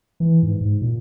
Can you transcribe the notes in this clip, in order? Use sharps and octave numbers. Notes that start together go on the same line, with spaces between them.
E3
G#2
G#2
A#2